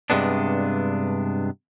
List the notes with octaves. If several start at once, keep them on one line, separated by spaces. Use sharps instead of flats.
G2 C3 G#3 B3 D4